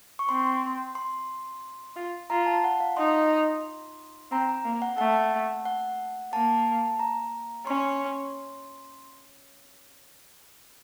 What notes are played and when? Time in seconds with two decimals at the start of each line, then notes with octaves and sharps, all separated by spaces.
0.19 C#6
0.29 C4 C6
0.95 C6
1.96 F4
2.30 F4 A#5
2.46 A5
2.64 F#5
2.80 F5
2.97 D#4 C6
4.31 C4 A#5
4.49 A#5
4.65 A#3
4.82 F#5
4.98 A3 F#5
5.65 F#5
6.33 A#3 A5
6.99 A#5
7.67 C#4 C6